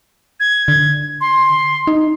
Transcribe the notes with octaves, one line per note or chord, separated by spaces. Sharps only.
G#6
D3
C6
D#4